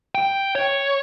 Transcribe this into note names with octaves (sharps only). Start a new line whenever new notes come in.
G5
C#5